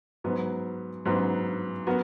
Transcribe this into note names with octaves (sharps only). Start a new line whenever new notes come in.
G#2 F#3 B3
G#2 F#3 B3
F#3 B3 F#4 A#4